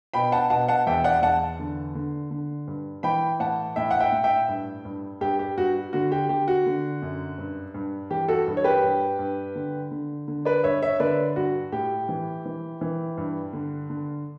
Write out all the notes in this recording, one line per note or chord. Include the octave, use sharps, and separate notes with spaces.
B2 G5 B5
F#5 A5
B2 F#5 A5
F#5 A5
E2 E5 G5
D5 F#5
E2 F#5 A5
D3
D3
D3
G2
E3 G5 B5
A2 F#5 A5
A2 E5 G5
F#5
E5 G5
A2
E5 G5
G2
G2
G2 G4
G4
G2 F#4
D3 F#4
G4
D3 G4
F#4
D3
F#2
G2
G2
E3 G4
F#4 A4
G2
C#5
G4 B4
G2
G2
D3
D3
D3
B4 D5
G2 C#5 E5
C#5 E5
D3 B4 D5
G2 F#4
A2 G4
E3
E3
E3
G2
D3
D3